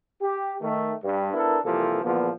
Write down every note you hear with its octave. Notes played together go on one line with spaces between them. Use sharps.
G4
D#3 A3
G2
B3 D4 E4 A4 A#4
C2 C3 E3 F3 A#3 A4
A#1 E2 D3 F3 A#3 B3